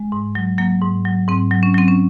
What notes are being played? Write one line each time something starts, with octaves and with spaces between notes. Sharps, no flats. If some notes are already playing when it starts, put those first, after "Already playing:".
Already playing: G#3
G#2
F#3
F#3 A#3
G#2
F#3
G#2 C4
F#3
C#4
F#3 C4
C#4